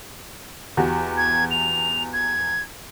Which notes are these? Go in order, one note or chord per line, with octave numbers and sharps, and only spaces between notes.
E2 F#4 G4
G#6
F7
G#6